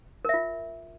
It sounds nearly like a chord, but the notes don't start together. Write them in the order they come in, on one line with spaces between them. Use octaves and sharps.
A#4 E5 F4